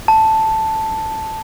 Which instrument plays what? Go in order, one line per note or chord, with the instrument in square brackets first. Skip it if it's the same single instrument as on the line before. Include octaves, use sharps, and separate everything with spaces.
[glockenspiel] A5